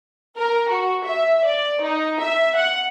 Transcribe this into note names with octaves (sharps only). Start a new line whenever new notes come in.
A#4
F#4
E5
D5
D#4
E5
F#5